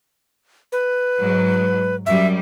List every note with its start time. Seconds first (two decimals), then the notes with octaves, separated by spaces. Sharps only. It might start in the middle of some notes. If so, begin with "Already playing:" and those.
0.72 B4
1.20 G#2 F#3
2.06 F#2 G3 E5